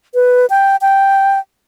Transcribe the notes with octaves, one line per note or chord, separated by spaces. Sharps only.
B4
G5
G5